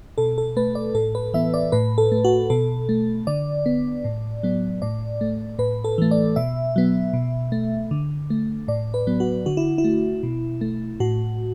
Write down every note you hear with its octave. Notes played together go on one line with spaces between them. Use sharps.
B2 A4
A4
A3 B4
D5
A2 A4
B4
E3 B3 E5
D5
A2 B4
A4
A3
F#4
B2 A4
A3
D3 D5
B3
A2
F#3 B3
A2 D5
A3
A2 B4
A4
E3 A3
D5
B2 E5
F#3 B3
B2
A3
D3
A3
A2 D5
B4
F#3 B3
F#4
D3 F#4
E4
E4
A3
B2
A3
A2 F#4